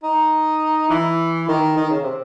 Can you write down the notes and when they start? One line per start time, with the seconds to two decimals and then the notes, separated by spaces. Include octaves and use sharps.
0.03 D#4
0.90 E3
1.48 D#3
1.77 D#3
1.90 C#3
2.03 C3